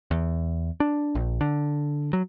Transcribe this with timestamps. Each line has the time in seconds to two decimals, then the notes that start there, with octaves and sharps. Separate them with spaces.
0.11 E2
0.80 D4
1.15 A#1
1.41 D3
2.13 F#3